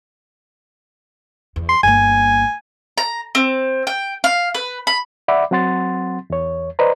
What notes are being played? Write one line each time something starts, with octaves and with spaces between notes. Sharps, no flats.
E2
C6
G1 A#3 G#5
A#5
C4
G5
F5
B4
B5
D5 E5 F#5 B5 D6
F#3 C4 F#5 C6 A6
E2 C#5
B4 C5 D5 D#5 A#5